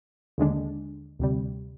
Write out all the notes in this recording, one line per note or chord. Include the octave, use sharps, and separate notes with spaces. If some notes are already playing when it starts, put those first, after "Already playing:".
D#2 D3 G#3 D4
D2 C3 G3